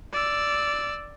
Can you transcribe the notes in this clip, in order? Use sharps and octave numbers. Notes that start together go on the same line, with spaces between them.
D5 E6